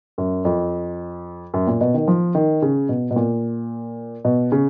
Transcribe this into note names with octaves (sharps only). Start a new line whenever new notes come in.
F#2
F2
F#2
A#2
B2
D#3
F3
D#3
C#3
B2
B2
A#2
B2
C#3